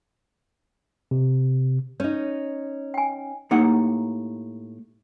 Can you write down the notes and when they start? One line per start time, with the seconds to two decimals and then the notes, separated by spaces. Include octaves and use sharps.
1.11 C3
2.00 C#4 D#4 C#5
2.94 G5 G#5
3.51 A2 A#3 D#4 G4 F#5